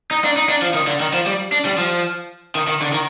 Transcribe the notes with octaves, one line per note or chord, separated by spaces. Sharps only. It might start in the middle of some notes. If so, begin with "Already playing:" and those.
D#4
D4
D#4
D4
F3
D#3
D3
D#3
F3
G3
D4
G3
F3
D#3
D#3
D3
D#3